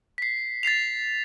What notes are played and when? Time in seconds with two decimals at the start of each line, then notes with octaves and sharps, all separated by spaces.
0.18 B6 C7
0.63 A6 B6 C7 F7